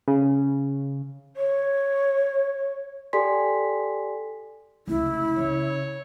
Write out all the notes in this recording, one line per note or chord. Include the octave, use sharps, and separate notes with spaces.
C#3
C#5
G4 A4 D5 G#5 C6 B6
F1 C#2 E4
C#3 C#5